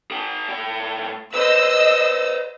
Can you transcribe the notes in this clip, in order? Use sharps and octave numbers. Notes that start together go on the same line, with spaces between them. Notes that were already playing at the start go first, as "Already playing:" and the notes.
G#4 G5
A2 G5
B4 C5 D#5 E6